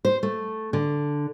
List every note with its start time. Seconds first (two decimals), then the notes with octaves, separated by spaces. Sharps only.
0.05 C5
0.23 A3
0.73 D3